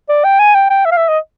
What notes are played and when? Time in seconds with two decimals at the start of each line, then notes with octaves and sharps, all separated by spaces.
0.09 D5
0.24 G5
0.39 G#5
0.55 G5
0.70 G5
0.85 E5
0.92 F5
0.97 E5
1.08 D#5